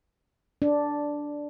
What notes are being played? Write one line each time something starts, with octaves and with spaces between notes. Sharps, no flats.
D4